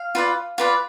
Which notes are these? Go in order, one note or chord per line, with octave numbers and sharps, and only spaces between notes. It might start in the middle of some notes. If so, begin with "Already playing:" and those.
Already playing: F5
F4 B4 D5
F4 B4 D5